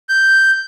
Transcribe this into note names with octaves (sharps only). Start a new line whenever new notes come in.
G6